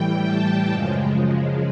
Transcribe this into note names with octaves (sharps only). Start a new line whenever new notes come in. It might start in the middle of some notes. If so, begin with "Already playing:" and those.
Already playing: A2 E3 G3 G5
A5
F#2 C#3 F3 G#3